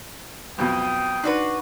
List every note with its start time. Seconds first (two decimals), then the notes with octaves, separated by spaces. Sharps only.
0.58 B1 F2 B2 G5 D#6
1.24 D4 D#4 F#4 B4 D5 C6